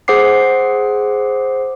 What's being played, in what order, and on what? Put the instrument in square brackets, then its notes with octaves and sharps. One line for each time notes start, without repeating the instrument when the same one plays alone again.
[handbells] G#4 C5 F#5 D6 C7